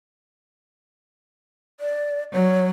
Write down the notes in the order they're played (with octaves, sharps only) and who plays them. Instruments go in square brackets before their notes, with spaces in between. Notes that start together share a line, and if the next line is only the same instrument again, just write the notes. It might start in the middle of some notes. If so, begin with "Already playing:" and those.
[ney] D5
[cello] F#3 [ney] C#5